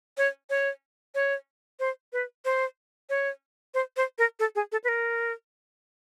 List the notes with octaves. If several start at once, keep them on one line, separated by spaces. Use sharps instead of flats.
C#5
C#5
C#5
C5
B4
C5
C#5
C5
C5
A#4
A4
G#4
A4
B4
A#4